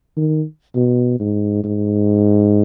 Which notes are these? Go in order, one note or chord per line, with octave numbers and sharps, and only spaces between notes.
D#3
B2
G#2
G#2